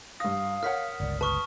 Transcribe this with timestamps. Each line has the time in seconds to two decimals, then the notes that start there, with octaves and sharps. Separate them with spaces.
0.20 G2 F5 D#6 A#6
0.63 A#4 C#5 F#5 F6 B6
1.00 G1 C#2 D5
1.21 B4 A5 C#6 D#6 F6